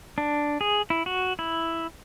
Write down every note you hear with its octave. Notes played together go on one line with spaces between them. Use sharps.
D4
G#4
E4
F#4
E4